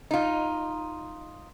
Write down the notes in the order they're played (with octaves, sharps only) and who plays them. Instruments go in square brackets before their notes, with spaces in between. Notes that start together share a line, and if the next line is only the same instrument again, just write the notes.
[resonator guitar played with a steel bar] D#4 F4